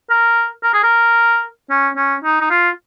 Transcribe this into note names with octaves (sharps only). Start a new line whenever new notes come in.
A#4
A#4
G#4
A#4
C#4
C#4
D#4
D#4
F4